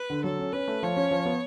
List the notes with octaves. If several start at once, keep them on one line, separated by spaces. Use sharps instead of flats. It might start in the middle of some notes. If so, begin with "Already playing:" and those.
Already playing: B4
D3
F#3 A4
C#4
C#4 B4
A3
F3 C#5
C#4
F3
B3